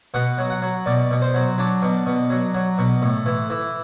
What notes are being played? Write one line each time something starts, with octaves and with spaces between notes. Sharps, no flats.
B2 F#5
F#3
F#5
F#3
B2 D5
B2
C5
F#3
F#3 D4
B2
B2
F#3
F#3
B2
A2
E3
E3